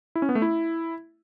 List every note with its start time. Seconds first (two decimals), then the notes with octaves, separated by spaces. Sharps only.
0.15 E4
0.22 C#4
0.29 B3
0.35 A3
0.42 E4